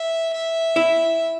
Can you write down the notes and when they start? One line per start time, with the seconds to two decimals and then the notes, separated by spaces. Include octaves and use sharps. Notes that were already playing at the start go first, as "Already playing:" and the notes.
Already playing: E5
0.33 E5
0.76 E4